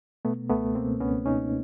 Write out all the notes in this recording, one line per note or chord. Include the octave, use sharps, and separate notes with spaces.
B2 A3 B3
C#2 A3 B3
B2 A#3 C4
C#2 B3 C#4
B2 C#4 D#4